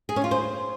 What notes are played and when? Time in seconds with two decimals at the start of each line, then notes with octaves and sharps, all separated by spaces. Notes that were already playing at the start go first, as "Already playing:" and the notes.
0.09 G#4
0.16 C#4
0.24 F4
0.31 C5